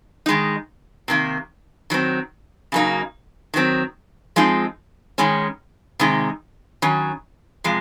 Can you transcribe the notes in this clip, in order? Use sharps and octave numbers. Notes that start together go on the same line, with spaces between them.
D#3 G#3 D#4
C3 D#3 A#3
D#3 F#3 C4
C#3 F#3 A#3 D#4
D#3 F#3 C4
F3 G#3 C4 D#4
D#3 G#3 C#4
C3 D#3 G#3 D#4
D#3 F#3 C#4
C3 F3 G#3